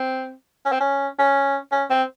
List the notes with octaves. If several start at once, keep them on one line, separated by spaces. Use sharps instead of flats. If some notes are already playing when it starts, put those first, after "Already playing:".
Already playing: C4
C#4
C4
C#4
C#4
C#4
C4